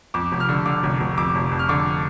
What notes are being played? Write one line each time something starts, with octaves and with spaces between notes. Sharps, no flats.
F2 D6
F1
F6
D3
D3 D6
F1
F1
F2 D6
F1
F2
F6
D3 D6